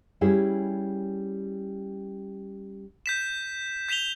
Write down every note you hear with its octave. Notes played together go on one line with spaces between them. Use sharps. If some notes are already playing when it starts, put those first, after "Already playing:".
G3 C#4 E4 G#4
G6 B6 E7
G6 B6 E7 F7 G7